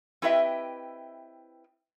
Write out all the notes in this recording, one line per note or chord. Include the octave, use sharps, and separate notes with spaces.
C4 E4 G4 B4 D#5 E5